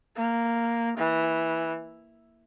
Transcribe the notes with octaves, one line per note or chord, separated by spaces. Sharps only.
A#3
E3